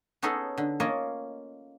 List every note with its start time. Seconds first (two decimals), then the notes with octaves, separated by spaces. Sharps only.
0.22 B3 C#4 D#4 G#4 A4
0.58 D3
0.80 A#3 C#4 F4 C#5 D#5